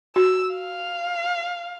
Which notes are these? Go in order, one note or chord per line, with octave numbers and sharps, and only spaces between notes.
F#4 E6
F5